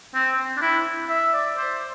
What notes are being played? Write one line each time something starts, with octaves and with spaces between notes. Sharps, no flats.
C4
D4
E4
E5
D5
C5